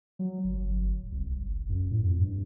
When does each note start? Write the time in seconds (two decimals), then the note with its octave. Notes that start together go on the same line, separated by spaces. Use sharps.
0.19 F#3
0.44 G1
0.59 G1
1.00 D1
1.12 C2
1.36 F#1
1.57 F1
1.69 F#2
1.91 A2
2.03 F2
2.21 G2